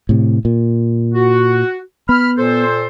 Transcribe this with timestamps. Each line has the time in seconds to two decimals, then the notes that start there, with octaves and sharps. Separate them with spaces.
0.09 A2 C3
0.45 A#2
1.15 F#4
2.09 B3 B5 F6
2.37 A#2 A4 C5